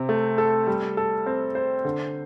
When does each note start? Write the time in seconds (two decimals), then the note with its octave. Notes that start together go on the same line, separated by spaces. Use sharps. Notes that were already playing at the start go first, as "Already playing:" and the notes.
Already playing: C3 C4
0.09 A3
0.38 A4
0.67 G3
0.97 A4
1.26 C4
1.55 C5
1.85 D3